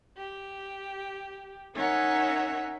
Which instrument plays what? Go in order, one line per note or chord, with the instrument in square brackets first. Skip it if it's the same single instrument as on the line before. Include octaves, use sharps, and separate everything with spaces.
[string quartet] G4
C#4 D#4 A#4 C#5 E5 F#5